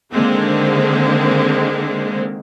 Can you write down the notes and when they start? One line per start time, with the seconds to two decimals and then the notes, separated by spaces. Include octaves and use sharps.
0.12 D3 D#3 G#3 A#3 C4